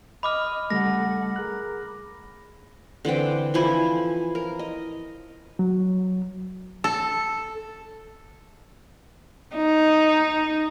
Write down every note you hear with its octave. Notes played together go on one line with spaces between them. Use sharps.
D#5 B5 D6 F6
C#3 G3 A3 A4 F#5 A#6
G#4 A#4 F#6
D3 E3 C4 G5
E3 F3 E4 G#5
A#4
D#5
F#3
A4
D#4